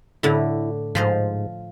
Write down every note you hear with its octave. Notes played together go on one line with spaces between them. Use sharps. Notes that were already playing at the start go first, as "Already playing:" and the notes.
A2 D3 E4
G#2 F3 C5 D#5